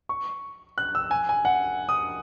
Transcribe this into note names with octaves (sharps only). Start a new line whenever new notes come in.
C#6
F#6
E6
G#5
G#5
F#5
D#6